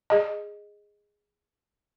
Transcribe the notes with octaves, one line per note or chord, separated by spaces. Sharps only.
G#4 D#5